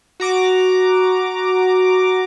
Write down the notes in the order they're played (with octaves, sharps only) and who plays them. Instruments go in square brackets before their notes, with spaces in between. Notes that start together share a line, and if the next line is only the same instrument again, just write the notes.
[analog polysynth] F#4 A#5 D6